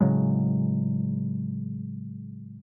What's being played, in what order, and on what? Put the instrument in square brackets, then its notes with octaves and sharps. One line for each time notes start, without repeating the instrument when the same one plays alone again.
[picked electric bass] A2 C#3 F#3 G#3